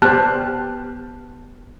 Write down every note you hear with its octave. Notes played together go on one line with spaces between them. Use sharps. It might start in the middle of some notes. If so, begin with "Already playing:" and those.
B3 G4 C5 A5 F6 F#6